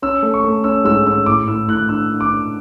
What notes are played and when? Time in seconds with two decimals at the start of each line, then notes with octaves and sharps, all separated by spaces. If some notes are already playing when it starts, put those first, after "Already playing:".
0.02 C#4 E6
0.23 A3
0.34 C#6
0.44 A3
0.64 C#4 E6
0.85 G#2 E6
1.05 C#4 E6
1.26 A2 D6
1.48 A2 E6
1.68 A2 F#6
1.89 D4 E6
2.10 D4
2.20 D6
2.30 D4